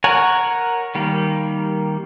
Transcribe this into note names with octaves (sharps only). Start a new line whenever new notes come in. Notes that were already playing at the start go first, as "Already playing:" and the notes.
A#4 C#5 F#5 G#5
D#3 G3 A#3